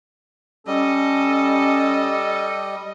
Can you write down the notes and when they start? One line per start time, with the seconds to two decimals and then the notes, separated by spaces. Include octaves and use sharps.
0.67 G3 C#4 A4 D#5